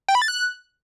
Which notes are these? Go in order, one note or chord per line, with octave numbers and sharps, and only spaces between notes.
G5
B5
A6
F#6